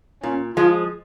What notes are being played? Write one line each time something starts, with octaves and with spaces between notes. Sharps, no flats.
A#2 C#4
F3 G#3 F4